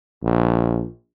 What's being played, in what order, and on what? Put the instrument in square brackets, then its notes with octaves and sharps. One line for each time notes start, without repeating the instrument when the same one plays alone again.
[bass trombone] A#1